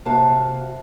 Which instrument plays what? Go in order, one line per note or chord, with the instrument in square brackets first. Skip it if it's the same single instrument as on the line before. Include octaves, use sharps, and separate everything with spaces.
[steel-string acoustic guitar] C3 A#3 F#4 F5 A5